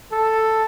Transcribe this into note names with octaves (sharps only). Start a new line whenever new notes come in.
A4